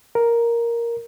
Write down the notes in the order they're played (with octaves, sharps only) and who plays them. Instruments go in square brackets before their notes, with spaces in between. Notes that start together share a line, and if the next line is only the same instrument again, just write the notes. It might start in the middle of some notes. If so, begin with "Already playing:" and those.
[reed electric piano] A#4